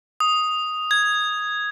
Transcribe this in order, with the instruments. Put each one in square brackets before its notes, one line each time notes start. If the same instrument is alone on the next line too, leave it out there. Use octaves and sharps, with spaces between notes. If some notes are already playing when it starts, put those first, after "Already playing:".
[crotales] D#6
G#6